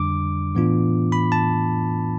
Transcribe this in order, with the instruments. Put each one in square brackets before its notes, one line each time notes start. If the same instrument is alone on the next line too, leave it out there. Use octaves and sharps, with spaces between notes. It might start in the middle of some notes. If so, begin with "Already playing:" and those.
Already playing: [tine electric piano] F2 D3 G3 D4 D6
A2 E3 B3 D4 F4
B5
A5